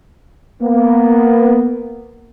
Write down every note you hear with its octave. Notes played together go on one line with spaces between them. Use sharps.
A#3 B3